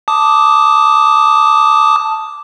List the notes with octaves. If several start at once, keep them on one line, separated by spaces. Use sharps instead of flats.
A5 D6 D#6